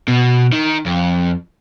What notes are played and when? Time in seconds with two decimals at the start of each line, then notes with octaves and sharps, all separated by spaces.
0.08 B2
0.52 D#3
0.86 F2